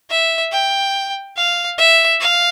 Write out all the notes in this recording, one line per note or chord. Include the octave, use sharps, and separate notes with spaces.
E5
G5
F5
E5
F5